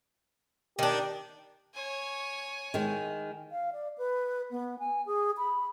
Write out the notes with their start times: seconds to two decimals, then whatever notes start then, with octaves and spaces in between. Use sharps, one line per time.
0.79 D#3 D4 G4
1.75 C#5 G#5
2.74 D#3 G#3
3.51 F5
3.73 D5
3.98 B4
4.51 B3
4.79 G#5
5.06 G#4
5.38 B5